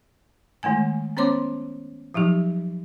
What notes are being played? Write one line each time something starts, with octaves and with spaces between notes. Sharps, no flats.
D#3 G#3 A3 G#5
B3 C#4 C5 C#5 C6 D6
F3 F#3 D#4 G4